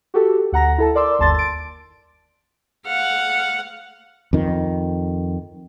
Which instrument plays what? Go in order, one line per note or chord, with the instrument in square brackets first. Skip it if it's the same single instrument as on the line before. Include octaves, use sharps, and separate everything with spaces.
[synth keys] F#4 G4 A4
D2 F#5 A#5 A#6
E4 A4 A5
A#4 D5 C6 D6 E6
G1 D#2 A5 C6 A6
A6 D7
[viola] F5 F#5
[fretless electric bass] F2 D#3